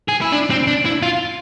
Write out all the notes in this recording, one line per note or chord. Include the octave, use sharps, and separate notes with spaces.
G#4
E4
D4
C4
D4
E4
F4